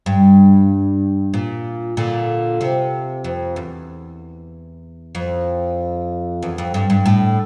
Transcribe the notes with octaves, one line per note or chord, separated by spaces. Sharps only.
G2
A#2
A#2 D3
C3
F2
E2
F2
E2
F2
G2
G2
A2